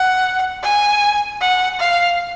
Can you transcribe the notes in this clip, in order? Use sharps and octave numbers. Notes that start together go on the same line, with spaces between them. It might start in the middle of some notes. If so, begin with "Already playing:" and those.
Already playing: F#5
G#5
F#5
F5